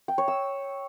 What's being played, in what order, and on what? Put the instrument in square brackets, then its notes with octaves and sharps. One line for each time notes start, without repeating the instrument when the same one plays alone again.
[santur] G5
C#5
E6